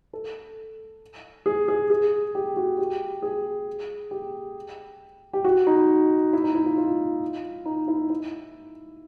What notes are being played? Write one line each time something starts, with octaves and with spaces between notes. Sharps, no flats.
A4
G#4
G#4
G#4
G4
F#4
G4
G#4
G4
G4
F#4
D#4
E4
D#4
E4
F4
F4
D#4
E4
E4